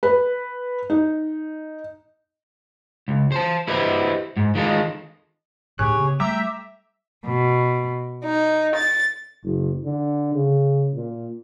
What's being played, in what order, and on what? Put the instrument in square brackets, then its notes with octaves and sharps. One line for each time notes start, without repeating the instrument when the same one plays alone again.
[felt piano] B4
D#4
[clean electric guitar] C#2
C5 A5
E4 G4 B4 C5 D#5
G#2
D#3 G#3 F4 F#4 A4 D#5
[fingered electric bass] D2 A2 D4 [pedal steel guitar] G4 F#6 [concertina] G#4 C#5
[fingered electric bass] C#3 B3
[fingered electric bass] G3 A3 [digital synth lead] E5 [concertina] G5 A#5 [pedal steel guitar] D6
[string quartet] B2
D#4
A6
[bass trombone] F#1
D3
C#3
A#2